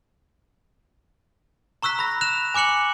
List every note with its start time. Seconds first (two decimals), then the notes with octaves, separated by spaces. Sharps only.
1.83 A#5 C#6 E6 F#6 B6
1.99 B5 A#6
2.21 F#6 E7 F7
2.54 G#5 D6 F#6 C#7 F#7